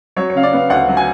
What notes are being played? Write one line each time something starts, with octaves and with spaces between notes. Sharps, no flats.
F#3 C#5
C#5
C#3 F5
D5
B3 F5
D2 F#5
F#3
G#5